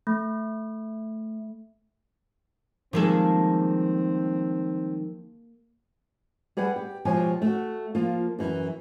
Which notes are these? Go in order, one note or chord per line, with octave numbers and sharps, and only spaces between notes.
A3
D#3 F3 G3 G#3 A#3 C4 G#4 A4
G3 G#4 B4 F#5 G5
G4
B2 F3 G#3 G4 C#5 G#5
A3 F#4
F3 A#3 F4
F#2 E3